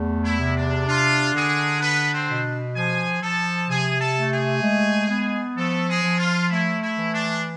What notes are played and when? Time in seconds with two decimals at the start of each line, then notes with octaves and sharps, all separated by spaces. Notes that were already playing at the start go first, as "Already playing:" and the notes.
Already playing: E2 A3
0.24 E4
0.40 C3
0.56 D4
0.86 D4 F4
1.34 D3 G#3 G#4
1.80 B3 D4 B4
2.12 C4 C5
2.28 B2
2.74 F3 G#4 G#5
3.22 F3 A4 A5
3.68 C3 G#4 G#5
3.99 A4 A5
4.16 A3
4.31 G#4 G#5
4.62 G#3
5.10 B3
5.56 F3 A3 A4
5.88 G#3 G#4
6.03 F3
6.18 F4
6.50 A3 E4
6.82 E4
6.97 E3
7.13 D4